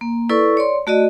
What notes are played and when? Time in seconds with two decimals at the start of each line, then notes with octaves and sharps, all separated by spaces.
0.01 A#3
0.29 E4 A4 B4 D5 C#6
0.57 C#5 D5 C6
0.87 A3 F#4 D5 D#5